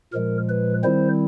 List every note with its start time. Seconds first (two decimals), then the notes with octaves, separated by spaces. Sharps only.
0.13 A#2 F3 G#3 A#4
0.49 B4
0.84 D#3 G3 C4 E4 C5